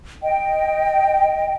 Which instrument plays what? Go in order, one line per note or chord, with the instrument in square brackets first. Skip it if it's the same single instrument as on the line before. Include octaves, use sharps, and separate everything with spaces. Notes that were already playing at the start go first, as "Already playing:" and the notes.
[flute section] D#5 G5